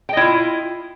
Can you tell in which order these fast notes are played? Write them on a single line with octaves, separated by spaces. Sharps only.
G5 D#5 E4 F4